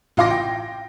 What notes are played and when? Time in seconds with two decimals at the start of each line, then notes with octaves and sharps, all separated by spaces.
0.17 A1 F4 F5 C6 D6 A#6
0.30 G5